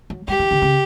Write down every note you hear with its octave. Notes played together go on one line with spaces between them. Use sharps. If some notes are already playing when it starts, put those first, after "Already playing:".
F#3
G3 G4
E3
D3
C#3